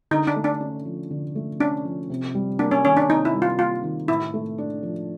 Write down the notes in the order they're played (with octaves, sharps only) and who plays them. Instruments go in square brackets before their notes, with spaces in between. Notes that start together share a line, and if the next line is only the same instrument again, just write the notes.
[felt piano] D3 [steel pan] D#4
[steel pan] D4
[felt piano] A3
[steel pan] D4
[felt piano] C#4
F3
D3
A3
[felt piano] C#4 [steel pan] D4
[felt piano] F3
C3
G3
[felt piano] A#3 [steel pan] D4
[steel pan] C#4
[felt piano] D#3 [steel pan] C#4
[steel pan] D4
[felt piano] C3 [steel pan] D#4
[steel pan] E4
[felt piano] G3
[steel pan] F4
[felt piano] A#3 [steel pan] F4
[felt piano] D#3
[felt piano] A2 [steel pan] E4
[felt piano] A3
D4
F3